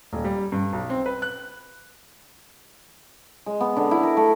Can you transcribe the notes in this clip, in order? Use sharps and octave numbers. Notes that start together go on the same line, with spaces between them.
D#1
G3
G2
B1
C4
B4
F#6
G#3
B3
D3
E4
A#4
A3